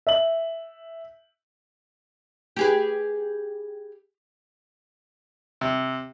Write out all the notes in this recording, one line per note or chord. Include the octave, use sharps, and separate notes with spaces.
E5 F#7
G4 G#4 B4
C3